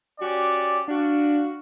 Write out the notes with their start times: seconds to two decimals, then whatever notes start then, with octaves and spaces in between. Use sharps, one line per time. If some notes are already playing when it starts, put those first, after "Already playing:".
0.20 C#4 F#4 G4 D5
0.88 D4 F#4 F5